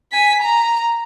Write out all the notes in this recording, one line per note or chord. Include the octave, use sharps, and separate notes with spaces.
G#5 B6
A#5